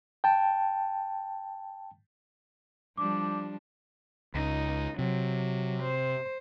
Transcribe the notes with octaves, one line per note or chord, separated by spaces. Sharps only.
G5 A5
F3 G3 D4 D6
C#2 D#4
C3 F#3
C5